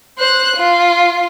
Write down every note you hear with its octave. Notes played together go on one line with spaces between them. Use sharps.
C5 F#6
F4